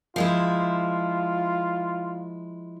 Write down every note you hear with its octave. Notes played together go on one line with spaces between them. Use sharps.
F3 G#3 E4 F4